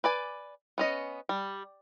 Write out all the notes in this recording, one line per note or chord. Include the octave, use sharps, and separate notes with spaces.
B4 D5 G#5
B3 C#4 D#5
G3